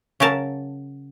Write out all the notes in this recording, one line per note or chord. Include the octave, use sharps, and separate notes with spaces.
C#3 F#3 A#4 A5